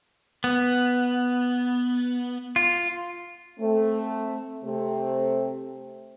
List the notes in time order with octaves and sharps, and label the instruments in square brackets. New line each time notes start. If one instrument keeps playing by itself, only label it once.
[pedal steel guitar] B3
F4
[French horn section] A3 C4
C3 A3 C4